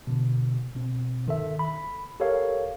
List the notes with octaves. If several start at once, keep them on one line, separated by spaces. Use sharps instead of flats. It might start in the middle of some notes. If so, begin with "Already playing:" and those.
B2 D3
B2 C4
G1 D#3 A4 E5
B5
G4 A4 A#4 C#5 F5